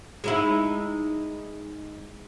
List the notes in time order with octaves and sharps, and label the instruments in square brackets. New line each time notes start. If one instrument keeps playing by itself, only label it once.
[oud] G#3 D#4 E4